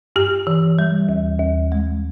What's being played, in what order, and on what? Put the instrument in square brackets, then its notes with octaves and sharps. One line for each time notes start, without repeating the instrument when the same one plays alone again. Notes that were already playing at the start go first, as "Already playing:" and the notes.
[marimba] G2 G4
E3
G3
D#2
D#2
G#3